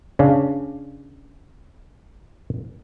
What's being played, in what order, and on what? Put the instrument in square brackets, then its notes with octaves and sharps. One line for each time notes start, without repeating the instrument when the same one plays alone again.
[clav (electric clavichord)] C#3 C#4 D4 F5